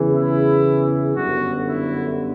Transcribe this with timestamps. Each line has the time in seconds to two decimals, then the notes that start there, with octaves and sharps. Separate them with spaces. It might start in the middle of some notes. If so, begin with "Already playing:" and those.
Already playing: E2 C#3 E3
0.13 E4
1.17 G1 F#2 D3 F#4
1.69 E4